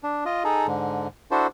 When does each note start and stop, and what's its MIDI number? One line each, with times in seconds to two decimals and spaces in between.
0.03 0.24 62
0.25 0.43 65
0.25 0.43 75
0.44 0.67 63
0.44 0.67 68
0.44 0.67 69
0.67 1.08 44
0.67 1.08 50
1.31 1.47 62
1.31 1.47 64
1.31 1.47 66
1.31 1.47 69
1.31 1.47 72